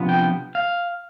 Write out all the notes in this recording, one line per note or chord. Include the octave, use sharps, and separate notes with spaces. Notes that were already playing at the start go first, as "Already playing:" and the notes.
Already playing: C3 F3 B3 D4
G5
F5